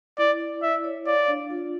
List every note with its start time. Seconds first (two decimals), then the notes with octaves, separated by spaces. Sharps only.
0.18 E4 D5
0.40 D5
0.62 E4 E5
0.84 C#5
1.06 D5 F5
1.28 D4
1.50 F4